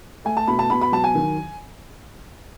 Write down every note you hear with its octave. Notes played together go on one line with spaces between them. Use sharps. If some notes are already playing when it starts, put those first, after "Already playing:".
A3 G#5
A5
B2 B5
A5
B2 B5
B5
F#3 A5
G#5
D#3